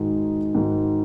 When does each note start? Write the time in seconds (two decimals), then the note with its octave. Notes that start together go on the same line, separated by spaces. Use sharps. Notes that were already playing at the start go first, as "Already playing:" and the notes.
Already playing: G#2 D#3 G#3 D#4 F#4
0.54 G#2 D#3 G#3 D#4 F#4